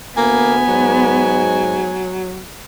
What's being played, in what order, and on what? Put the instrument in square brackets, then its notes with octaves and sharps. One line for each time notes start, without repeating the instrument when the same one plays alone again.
[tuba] D2 [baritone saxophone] A#3 [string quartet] B3 [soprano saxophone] G#5
[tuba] G#2 [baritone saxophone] F#3